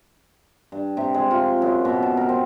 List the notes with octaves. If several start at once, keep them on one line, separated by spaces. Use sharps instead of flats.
G2
C3
G#3
F4
F#2
B2
A5
A#4
C4